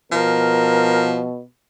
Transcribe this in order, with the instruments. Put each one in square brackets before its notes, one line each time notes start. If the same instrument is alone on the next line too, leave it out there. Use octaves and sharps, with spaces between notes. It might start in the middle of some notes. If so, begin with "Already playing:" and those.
[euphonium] B2 [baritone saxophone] F3 [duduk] A#4